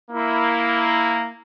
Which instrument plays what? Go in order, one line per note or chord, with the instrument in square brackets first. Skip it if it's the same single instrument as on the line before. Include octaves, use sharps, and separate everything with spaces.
[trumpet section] A#3 E4